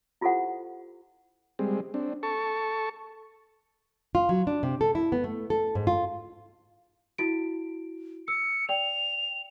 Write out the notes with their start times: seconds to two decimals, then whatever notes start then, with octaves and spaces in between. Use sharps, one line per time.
0.21 E4 F4 G4 A4 C5 F#5
1.59 G3 G#3 C4
1.94 C4 D4
2.23 A4 A5 C#6
4.15 F4
4.29 F#3
4.47 D4
4.63 C3
4.81 A4
4.95 E4
5.12 B3
5.24 A3
5.50 A4
5.75 G#2
5.87 F4
7.18 E4 F#4 D7
8.28 E6 C#7
8.69 D5 G5 F7